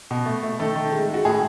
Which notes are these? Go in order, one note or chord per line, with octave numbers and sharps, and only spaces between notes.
B2
A3
A3
D#3 A3 A4
D#3
G#3
G#3
F#4
A2 G#4